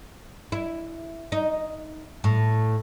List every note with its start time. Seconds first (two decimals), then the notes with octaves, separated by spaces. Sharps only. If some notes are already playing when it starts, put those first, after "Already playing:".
0.52 E4
1.32 D#4
2.24 A2